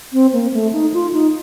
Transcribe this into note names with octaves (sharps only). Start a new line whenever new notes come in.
C4
A#3
A3
D#4
F4
D#4